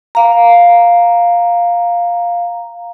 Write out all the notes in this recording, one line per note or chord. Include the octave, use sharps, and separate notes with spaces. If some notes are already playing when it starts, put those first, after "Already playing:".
F5 A#5